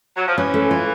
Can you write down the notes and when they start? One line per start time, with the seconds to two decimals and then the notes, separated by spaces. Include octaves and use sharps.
0.17 F#3
0.27 F3
0.37 E3 C#4
0.54 A3
0.71 F4